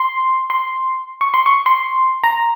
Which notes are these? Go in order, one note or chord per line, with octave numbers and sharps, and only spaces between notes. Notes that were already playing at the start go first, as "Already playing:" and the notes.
Already playing: C6
C6
C#6
C6
C#6
C6
A#5